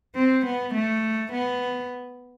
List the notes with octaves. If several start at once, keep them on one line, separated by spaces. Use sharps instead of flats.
C4
B3
A3
B3